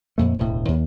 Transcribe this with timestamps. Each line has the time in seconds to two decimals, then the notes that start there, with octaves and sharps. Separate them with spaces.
0.18 F2 A#2 A3
0.39 E1 D2 A2
0.68 D#2